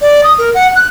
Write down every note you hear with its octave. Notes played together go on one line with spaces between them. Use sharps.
D5
D#6
A#4
F#5
F#6